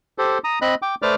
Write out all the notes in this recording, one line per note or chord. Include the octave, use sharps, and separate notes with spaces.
G4 A4 C5
A#5 D#6
C4 D#5 B5 F#6
G5 D6
A3 B4 C5 D5 D6 F6